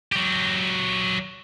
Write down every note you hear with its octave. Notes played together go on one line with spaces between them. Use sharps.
F#3 G4